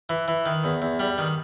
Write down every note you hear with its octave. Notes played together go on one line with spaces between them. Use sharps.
E3
E3
D#3
E2
E2
G3
D#3